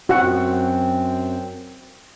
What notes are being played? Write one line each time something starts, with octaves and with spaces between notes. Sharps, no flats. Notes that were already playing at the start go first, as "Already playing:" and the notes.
F#2 C4 F#4 F#5